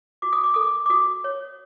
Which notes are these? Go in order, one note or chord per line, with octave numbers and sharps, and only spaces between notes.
F#4 D6
D#6
D6
A4 D#6
D6
D6
F#4 D#6
C#5